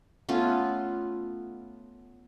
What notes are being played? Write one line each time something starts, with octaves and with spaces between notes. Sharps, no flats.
A3 B3 C#4 F4